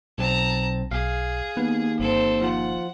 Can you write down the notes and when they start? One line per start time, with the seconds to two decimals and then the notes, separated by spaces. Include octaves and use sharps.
0.18 B1 C4 A5 A#5
0.91 B1 G#4 F5
1.57 D#2 B3
2.00 G1 C4 A4
2.41 F3 F4 F#5